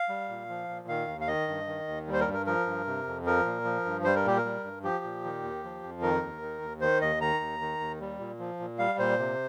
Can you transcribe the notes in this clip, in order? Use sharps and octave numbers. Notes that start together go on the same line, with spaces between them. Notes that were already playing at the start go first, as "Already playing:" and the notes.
Already playing: F5
G3
A#2
F3
A#2
D#3 F5
D#2
F5
D#3 D#5
G2
D#3
D#2
G3
C5
A#4
G2
A#4
F3 A#4
G2
C3
F2
F3 A#4
A#2
F3
G2
G3 C5
A#4
A#2 G4
A#4
G3
G2
F3 G4
A#2
D#3
D#2
F3
F2
D#3 A#4
D#2
D#3
D#2
D#3 C5
D#2 D#5
D#3 A#5
D#2
D#3
D#2
G3
A#2
F3
A#2
G3 F5
A#2 C5
C3